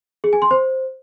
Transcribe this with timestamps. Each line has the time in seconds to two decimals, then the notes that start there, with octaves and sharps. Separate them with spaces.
0.24 G#4
0.33 G#5
0.42 C6
0.51 C5